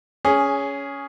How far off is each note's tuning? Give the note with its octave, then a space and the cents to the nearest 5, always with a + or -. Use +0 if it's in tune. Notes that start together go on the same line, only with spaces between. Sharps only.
C#4 +15 G#4 +0